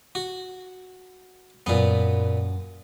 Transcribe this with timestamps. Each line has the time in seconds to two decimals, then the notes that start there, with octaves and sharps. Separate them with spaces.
0.15 F#4
1.66 F#2 A#2 B3